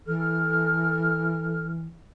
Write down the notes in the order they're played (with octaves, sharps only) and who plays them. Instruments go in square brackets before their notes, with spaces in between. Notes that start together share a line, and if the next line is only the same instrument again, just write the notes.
[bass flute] E3 [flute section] A4 F6